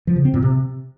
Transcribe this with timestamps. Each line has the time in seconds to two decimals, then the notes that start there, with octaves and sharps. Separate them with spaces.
0.07 F3
0.16 C#3
0.25 C4
0.34 A#2
0.42 C3